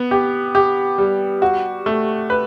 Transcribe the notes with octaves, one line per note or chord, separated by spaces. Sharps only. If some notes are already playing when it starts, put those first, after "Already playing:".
Already playing: B3
G4
G4
G3
F#4
A3
B4